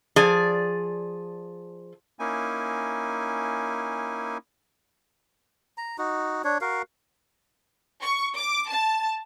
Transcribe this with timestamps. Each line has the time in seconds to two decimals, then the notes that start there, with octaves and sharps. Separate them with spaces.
0.16 F3 G#4 D5
2.19 A#3 C#4 D#4 E4 G#5
5.78 A#5
5.98 D#4 F#4
6.44 D4 C#5
6.61 F#4 A#4 F5
8.01 C#6
8.36 D6
8.69 A5